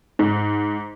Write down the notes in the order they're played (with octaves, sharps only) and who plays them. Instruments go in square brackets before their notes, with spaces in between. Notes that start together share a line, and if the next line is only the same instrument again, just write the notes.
[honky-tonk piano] G#2